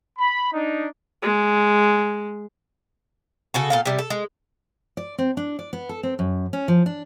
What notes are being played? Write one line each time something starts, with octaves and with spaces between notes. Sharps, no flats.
B5
D4 D#4
G#3
C#3 F#4 A4
A#2 A4 F5
C3 G3
A4
G#3
D5
C4
D4
D5
B3
A4
C4
F#2
C#4
F3
D4